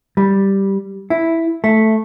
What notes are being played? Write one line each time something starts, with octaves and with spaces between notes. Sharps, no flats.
G3
E4
A3